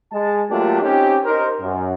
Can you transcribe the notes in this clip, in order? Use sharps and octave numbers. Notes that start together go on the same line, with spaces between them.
G#3 A5
F#3 A3 A#3 D4 F4 G4
C4 C#4 D#4 G4
D#4 A#4 C5
F#2